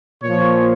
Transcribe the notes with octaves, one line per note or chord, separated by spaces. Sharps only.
A#2 F3 C#5